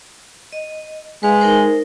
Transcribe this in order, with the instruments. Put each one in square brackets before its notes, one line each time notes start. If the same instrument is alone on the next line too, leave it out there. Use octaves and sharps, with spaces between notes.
[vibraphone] D#5
[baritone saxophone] G#3 [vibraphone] B4 F5
[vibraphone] D#4 A#4 C5